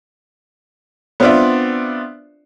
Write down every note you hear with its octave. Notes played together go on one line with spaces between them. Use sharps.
B3 C4 D4 F4 D5 E5